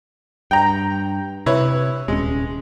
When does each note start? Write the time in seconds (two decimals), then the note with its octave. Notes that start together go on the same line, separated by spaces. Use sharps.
0.51 G2 G5 A#5
1.46 C3 E4 B4 C#5
2.08 D#1 G#3 C#4